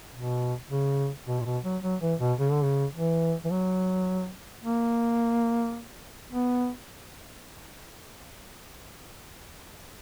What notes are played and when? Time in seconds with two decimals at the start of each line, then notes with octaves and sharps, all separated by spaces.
0.14 B2
0.70 C#3
1.27 B2
1.40 A#2
1.45 B2
1.64 F#3
1.83 F#3
2.01 E3
2.20 B2
2.39 C#3
2.51 D3
2.63 C#3
2.95 E3
3.45 E3
3.51 F#3
4.63 A#3
6.31 B3